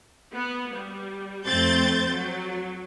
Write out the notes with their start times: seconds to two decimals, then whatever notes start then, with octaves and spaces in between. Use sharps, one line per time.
0.34 B3
0.75 G3
1.47 F2 A3 C4 G6 A6
2.11 F#3